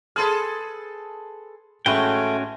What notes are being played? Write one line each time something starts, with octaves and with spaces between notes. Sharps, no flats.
G#4 A4 B4 A5 C6 F6
A1 G#3 A3 C#4 F#4 B4 G5